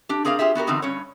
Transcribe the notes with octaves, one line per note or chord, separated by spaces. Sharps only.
D4 G4
C4 G#4 A#4 D5 F5
F4 G4 G#4 E5
B3 F#4 G4 A#4
E2 D3 C4 D#4 F#4
G2 C#4 C#5